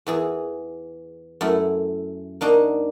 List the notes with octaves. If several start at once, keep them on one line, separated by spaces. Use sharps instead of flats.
E2 E3 G#4
F#2 A3 E4
A#3 D4 D#4 F#4